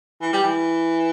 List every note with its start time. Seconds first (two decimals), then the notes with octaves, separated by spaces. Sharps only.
0.21 E3
0.33 G3
0.44 E3